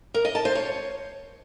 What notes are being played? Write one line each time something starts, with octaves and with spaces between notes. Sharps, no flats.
A#4
D#5
A5
C5
C#5